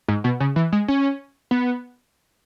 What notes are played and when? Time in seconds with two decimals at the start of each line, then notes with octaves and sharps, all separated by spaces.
0.08 G#2
0.24 B2
0.40 C#3
0.56 E3
0.72 G#3
0.88 C#4
1.51 B3